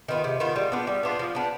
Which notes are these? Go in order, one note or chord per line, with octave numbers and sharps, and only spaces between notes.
D#3 B3 F4
C3
D#3 B3 F4
G3
B3 D4 F4
G3
B3 D4 F4
F3
B3 D4